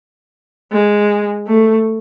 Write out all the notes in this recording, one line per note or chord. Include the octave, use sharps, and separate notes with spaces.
G#3
A3